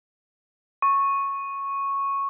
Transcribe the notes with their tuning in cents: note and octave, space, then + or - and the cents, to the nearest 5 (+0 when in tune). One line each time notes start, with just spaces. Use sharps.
C#6 -10